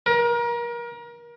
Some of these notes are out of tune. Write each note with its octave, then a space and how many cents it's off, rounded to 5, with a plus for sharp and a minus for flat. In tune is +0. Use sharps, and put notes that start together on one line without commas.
A#4 +30